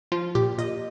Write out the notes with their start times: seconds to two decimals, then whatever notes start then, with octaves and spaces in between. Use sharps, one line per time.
0.12 F3 F4
0.35 A#2 G4
0.58 A#2 D#5